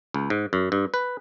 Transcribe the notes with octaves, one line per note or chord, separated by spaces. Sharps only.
C#2
G#2
F#2
G2
B4